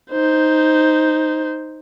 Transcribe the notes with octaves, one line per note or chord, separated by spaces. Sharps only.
D#4 C5